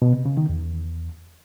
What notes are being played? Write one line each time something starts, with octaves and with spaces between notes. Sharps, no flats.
B2
C3
C#3
D#3
E2